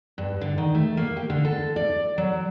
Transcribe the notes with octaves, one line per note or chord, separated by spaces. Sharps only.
G2
D3
D#3
A3
A#3
G4
D3
A4
D5
F#3